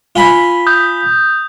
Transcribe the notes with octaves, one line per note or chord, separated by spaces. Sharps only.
F4 G#5 B5
D#6 G6